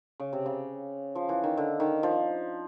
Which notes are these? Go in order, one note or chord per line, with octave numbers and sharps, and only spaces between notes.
C#3
C3
C#3
F3
E3
D#3
D3
D#3
F3